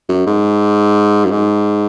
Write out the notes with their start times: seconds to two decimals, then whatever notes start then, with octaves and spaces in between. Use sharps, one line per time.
0.09 F#2
0.27 G#2
1.25 F#2
1.31 G#2